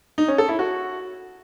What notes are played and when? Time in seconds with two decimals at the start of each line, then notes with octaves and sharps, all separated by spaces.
0.18 D#4
0.28 C#4
0.38 A4
0.49 E4
0.59 F#4